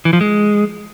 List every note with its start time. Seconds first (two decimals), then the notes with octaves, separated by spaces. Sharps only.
0.05 E3
0.13 F3
0.21 G#3